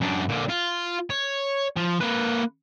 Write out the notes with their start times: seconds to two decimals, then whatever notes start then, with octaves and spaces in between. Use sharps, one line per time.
0.01 F#2 D4
0.29 A#2 D3
0.49 F4
1.10 C#5
1.77 F3
2.01 A#3 B4